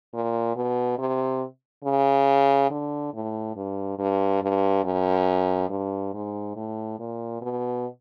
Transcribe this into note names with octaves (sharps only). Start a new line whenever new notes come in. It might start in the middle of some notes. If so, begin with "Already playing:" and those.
A#2
B2
C3
C#3
D3
A2
G2
G2
G2
F#2
G2
G#2
A2
A#2
B2